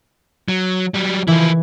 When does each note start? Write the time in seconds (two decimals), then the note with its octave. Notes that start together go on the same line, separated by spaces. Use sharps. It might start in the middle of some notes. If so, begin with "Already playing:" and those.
0.48 F#3
0.94 F#3 G3
1.28 E3 F3 E4